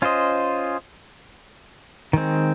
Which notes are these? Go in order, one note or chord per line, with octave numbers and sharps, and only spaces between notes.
C#4 F4 C5 D#5
D#3 G#3 C4